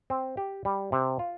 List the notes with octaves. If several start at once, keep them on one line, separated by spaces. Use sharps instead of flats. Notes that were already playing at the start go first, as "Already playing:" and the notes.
C4
G4
G3
C3
F4